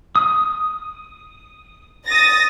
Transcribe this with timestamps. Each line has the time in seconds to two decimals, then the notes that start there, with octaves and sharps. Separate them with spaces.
0.16 D#6
2.07 D#6 A6 A#6